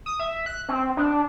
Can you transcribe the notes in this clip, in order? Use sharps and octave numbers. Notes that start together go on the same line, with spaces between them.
D#6
E5
F#6
C4
D4